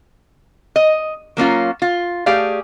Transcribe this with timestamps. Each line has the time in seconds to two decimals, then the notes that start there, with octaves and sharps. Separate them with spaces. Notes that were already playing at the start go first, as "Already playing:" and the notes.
0.76 D#5
1.37 F#3 A#3 C#4 F4
1.82 F4
2.26 A3 G4 G#4 D5 F5